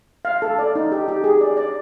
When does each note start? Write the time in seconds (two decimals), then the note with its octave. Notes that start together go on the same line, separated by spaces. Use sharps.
0.25 F5
0.42 A4
0.59 D5
0.75 D#4
0.92 G4
1.08 G4
1.24 G#4
1.41 D5
1.57 D5